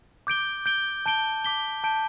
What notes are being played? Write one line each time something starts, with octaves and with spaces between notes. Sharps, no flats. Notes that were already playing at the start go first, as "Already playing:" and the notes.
D6 G6 D7 G7
G6 D7 G7
A5 G6 D7 G7
D6 B6 G7
A5 G6 D7